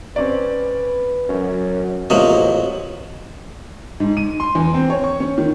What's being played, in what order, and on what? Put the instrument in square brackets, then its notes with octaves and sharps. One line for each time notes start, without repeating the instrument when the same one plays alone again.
[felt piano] C4 C#4 D5 [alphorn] B4
[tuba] F#2 [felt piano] C#4
[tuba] A1 [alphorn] G#2 [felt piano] C3 A#3 B3 [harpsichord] F3 F#3 D#5
[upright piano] G#2
D#7
C6
E2
C4
C#5
C#6
C#4
D#3